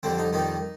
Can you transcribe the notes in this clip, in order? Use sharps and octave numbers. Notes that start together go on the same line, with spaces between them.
F2 D3 G3 C4
D#4
F2 D#3 G3 D#4